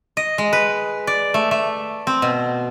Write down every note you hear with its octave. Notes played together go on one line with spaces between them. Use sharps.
D#5
G#3
B4
D5
A3
A3
C4
B2